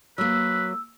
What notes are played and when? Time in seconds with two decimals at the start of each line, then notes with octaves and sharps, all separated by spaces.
0.18 F#3 A#3 B4 E6